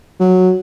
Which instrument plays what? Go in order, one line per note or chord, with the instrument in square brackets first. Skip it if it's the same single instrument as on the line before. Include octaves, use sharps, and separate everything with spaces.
[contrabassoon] F#3